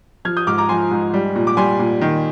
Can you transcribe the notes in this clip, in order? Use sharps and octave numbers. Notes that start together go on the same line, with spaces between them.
F3 F6 G#6
D#6 G6
G#2 D6 F6
A#5 D6
F3 G#5 C6
G#2
G3
A#2
D6
G3 G#5 C6
A#2
D#3